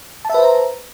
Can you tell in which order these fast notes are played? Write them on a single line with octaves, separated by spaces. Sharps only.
A5 E5 B4 C5 A#5